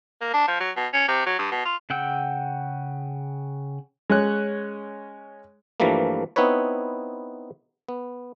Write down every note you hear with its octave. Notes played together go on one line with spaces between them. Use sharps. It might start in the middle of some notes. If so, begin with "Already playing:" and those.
A#3
D4
F3
F#3
B2
C#4
C3
F#3
G2
B2
F4
C#3 F#5 G5 E6
G#3 C#4 F#6
G2 E3 F3 G3 A3 A#3
B3 C4 D#4 E4 B4 C#5
B3